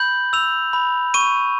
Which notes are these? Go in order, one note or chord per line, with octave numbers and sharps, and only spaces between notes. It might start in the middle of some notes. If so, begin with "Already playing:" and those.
Already playing: B5 G6 F#7
E6 F7
B5
C#6 D#7